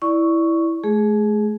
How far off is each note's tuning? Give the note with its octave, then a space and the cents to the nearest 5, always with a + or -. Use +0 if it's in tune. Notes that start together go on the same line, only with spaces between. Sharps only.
E4 +0 D5 +0 C#6 +5
A3 -45 G#4 +0